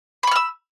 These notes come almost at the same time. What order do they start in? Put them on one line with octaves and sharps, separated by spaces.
B5 C#6 F6 E6